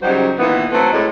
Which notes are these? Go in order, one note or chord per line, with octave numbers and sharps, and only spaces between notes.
C#3 F#3 G3 D#4 G4 C5
A#2 D#3 E3 B3
F#3 A3 C4 A4 B4
A2 G#3